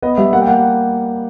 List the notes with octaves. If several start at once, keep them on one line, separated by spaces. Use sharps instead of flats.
B3 D#5
G3 E5
A#3 F#5
G5
A#3 F#5